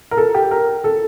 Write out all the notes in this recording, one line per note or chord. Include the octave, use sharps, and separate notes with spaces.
A#4
A4
G4
A#4
A4